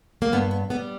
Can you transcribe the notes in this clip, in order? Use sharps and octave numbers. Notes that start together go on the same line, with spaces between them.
A#3
G2 B3
B3
G3 B3